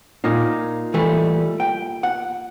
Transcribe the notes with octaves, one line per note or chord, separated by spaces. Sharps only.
A#2 D#4 F5
E3 G3 A3
G5
F#5